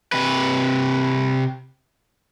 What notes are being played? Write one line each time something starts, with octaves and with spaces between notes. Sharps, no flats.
C3 B4